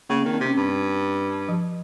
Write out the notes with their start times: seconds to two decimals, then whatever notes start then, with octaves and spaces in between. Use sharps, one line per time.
0.10 C#3 A#3
0.21 C4
0.25 D#3
0.34 C4
0.40 C3
0.46 C#4
0.57 G2
1.49 F3